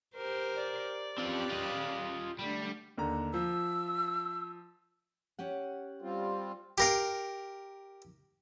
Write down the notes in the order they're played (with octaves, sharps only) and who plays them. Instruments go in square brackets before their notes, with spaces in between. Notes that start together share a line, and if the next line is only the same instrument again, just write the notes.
[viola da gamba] G4 A#4 C5
[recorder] D5
[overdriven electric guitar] C4 F4 [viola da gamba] C#4 G4 B4
[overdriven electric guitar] F4 D#5
[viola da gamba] D3 A3 [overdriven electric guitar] G3
[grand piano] D#2 D3 A#5
[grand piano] F3 [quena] E6
[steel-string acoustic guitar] C#4 G4 F#5
[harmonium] G3 C4 F4
[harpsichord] G4 A#4 F5